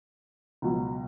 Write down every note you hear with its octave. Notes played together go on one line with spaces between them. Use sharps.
C#2 B2 F#3